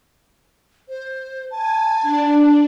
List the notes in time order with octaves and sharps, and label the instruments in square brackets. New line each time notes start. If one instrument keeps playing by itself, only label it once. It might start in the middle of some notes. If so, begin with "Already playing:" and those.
[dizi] C5
[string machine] G#5 [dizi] A5
[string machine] D4